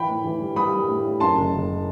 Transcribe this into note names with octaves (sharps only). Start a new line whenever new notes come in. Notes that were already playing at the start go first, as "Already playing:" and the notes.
Already playing: E3 G5 B5
A2
E3
G3
G3 B5 D#6
G3
A2
A2
F#2 A5 C6
F#1
F#1